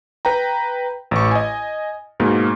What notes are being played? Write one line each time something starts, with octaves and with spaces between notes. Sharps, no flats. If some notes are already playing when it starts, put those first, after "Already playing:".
B4 G5 A#5
A1 C#6
D#5 G#5
G#2 B2 A#3